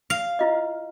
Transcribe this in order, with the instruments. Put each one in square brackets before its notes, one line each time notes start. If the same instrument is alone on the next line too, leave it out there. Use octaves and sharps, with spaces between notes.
[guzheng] F5
[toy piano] E4 F4 D#5